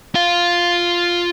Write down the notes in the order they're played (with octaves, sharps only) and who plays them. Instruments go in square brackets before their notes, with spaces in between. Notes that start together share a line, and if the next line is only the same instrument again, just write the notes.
[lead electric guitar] F4 F5